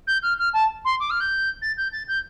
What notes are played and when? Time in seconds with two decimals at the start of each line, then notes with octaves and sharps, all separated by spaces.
0.07 G6
0.22 F6
0.38 F6
0.53 A5
0.84 C6
0.99 D6
1.10 F6
1.20 G6
1.61 A6
1.77 G6
1.92 A6
2.08 G6